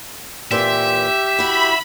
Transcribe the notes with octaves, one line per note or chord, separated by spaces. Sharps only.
A#2 E3 C4 G4 E5
E4 F#4 B5